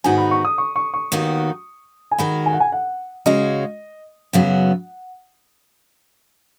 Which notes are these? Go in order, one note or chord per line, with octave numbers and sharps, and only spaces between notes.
G#2 D#3 B3 D#4 F#4 G#5
B5
C#6
D#6
C#6
C#6
C#6
D#2 D#3 B3 D#4 F#4
G#5
D#3 G#3 D#4 F#4 B5
G#5
F#5
G#5
F#5
C#3 G#3 C#4 F#4 D#5
F#2 C#3 F#3 B3 F#4 F#5